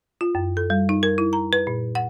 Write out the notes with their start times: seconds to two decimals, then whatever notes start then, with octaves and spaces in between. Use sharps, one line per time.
0.21 F4
0.35 F#2
0.57 A4
0.70 G3
0.89 D#4
1.03 A#4
1.18 E4
1.33 A#5
1.53 B4
1.67 A#2
1.95 F#5